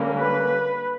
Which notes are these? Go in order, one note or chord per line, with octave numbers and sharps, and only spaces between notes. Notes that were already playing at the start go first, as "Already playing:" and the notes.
Already playing: D3 G3 A#3 C#4
B4